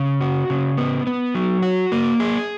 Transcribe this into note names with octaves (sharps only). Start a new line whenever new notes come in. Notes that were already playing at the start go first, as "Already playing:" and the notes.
Already playing: C#3
F#4
C#3
B3
B3
F#3
F#4
A#3
G#4